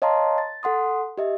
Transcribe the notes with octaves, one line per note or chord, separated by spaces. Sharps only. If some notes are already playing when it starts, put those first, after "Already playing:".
C#5 D#5 F5 A5 A#5 C6
A6
A4 F#5 C6 D#6
G4 D#5 E5